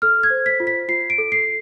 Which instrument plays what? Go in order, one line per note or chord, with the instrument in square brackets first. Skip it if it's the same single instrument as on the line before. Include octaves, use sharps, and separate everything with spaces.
[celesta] A4 F6
G#6
C5
B6
F4
B6
F4 C7
D7
A4
C7